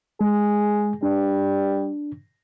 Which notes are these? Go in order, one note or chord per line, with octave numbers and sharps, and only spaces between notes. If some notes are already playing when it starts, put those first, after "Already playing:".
G#3 G#4
G3 D4